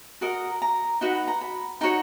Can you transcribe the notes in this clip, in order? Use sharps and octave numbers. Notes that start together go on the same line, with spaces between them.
F#4 A#4 D#5 A#5
A#5
D#4 F#4 B4 F#5
B5
A#5
B5
D#4 F#4 C#5 A#5